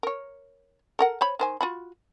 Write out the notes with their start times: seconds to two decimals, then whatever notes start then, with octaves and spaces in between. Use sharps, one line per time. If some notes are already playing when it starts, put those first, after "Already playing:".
0.03 A#4 C#5
0.99 A4 A#4 F#5
1.21 C5 C#5 B5
1.39 D#3 C5 G#5
1.61 F4 F#4 B5